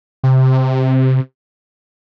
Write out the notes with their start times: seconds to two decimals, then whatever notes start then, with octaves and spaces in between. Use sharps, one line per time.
0.23 C3